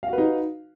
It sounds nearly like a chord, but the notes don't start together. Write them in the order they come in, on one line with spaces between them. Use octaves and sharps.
F5 F#4 B4 D#4